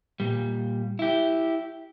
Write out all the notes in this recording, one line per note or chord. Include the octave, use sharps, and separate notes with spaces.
A#2 G3
E4 G4